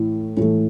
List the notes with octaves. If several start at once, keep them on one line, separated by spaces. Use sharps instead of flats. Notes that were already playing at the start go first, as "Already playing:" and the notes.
Already playing: A2 E3 A3
A2 E3 A3